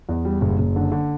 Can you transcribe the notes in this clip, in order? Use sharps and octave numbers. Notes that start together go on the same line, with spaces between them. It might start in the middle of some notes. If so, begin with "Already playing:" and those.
E2
G3
F#1
F#1
D3
D3